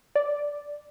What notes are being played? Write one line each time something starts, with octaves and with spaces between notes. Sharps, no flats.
D5